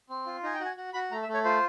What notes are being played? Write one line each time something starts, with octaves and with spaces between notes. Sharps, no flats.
C4
F4
D#4 G#5
G5
F#4
G#5
F#4
F#4 B5
A3 A#5
E5
A3
C#5
F4 C5